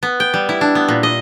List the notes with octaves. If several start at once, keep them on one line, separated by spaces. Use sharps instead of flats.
B3
G5
G3
E4
D4
B3
A#2
D#5